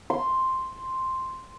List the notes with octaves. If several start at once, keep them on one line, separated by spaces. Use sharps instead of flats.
C6